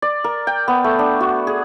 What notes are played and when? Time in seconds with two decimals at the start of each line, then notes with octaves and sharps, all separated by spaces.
0.02 D5
0.24 A#4
0.47 G5
0.68 B3
0.84 A3
0.99 D4
1.21 F#4
1.47 G#4